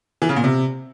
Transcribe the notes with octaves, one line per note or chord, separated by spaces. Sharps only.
E3
C#3
A#2
C3